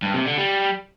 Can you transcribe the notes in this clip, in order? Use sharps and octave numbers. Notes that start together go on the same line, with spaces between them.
G2
C3
D3
G3